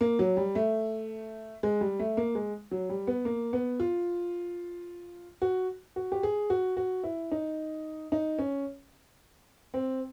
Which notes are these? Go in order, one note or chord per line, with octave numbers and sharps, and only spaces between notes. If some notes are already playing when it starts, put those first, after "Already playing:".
A#3
F#3
G3
A3
G#3
G3
A3
A#3
G#3
F#3
G3
B3
A#3
B3
F4
F#4
F#4
G4
G#4
F#4
F#4
E4
D#4
D#4
C#4
C4